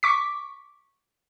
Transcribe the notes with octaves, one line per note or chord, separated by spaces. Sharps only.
C#6 D6 B6